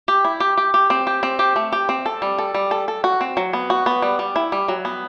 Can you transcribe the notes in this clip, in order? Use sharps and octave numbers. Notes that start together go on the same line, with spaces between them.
G4
E4
G4
G4
G4
C4
G4
C4
G4
A3
G4
C4
A4
G3
A4
G3
A4
A4
F#4
C4
F#3
B3
F#4
B3
G3
G3
E4
G3
F#3
B3